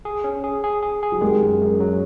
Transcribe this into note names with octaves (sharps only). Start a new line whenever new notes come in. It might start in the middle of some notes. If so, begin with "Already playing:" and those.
G#4
C#4
G#4
G#4
G#4
G#4
F#3
D#3 G#3
F#2
F#2
F#3